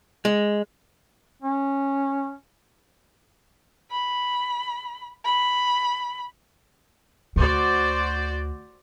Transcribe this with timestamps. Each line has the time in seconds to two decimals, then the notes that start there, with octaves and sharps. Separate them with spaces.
0.25 G#3
1.42 C#4
3.91 B5
5.25 B5
7.36 D2 D3 F#4 C5 D5